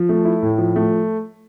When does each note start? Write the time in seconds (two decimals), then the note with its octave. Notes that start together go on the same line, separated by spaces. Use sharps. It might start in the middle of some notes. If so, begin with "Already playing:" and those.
Already playing: F3
0.09 A3
0.25 E4
0.42 A2
0.58 F3
0.76 A3